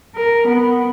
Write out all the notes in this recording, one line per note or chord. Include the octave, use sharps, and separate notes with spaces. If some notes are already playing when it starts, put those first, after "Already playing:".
A#4
B3